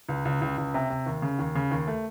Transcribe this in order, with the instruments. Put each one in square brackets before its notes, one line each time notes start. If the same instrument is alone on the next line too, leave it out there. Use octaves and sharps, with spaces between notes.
[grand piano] C#2
C#2
C#2
C#2
C3
C3
D#2
C#3
D#2
C#3
D#2
A3